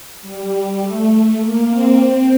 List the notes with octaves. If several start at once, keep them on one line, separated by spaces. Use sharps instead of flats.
G3
G3
A3
A#3
C4
C4